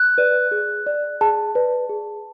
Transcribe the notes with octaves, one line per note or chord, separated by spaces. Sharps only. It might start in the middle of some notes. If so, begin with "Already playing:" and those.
Already playing: F#6
B4 D5
G#4
D5
G#4 A5
B4 D5
G#4